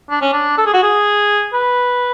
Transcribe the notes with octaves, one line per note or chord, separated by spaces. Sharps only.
D4
C#4
D4
A4
G#4
F#4
G#4
B4